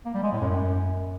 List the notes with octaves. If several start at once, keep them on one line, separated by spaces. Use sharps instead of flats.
A#3
G3
G#3
A2
F#2